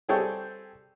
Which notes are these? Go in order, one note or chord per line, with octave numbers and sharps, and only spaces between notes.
G3 C4 G#4 A4 C#5 G5